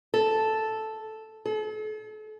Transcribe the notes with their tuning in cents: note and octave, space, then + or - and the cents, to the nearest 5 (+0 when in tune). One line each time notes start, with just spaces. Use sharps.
A4 -5
A4 -40